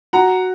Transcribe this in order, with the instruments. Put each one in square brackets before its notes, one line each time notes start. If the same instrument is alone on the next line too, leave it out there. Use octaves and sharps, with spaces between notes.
[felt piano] F#4 [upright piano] F#5 A#5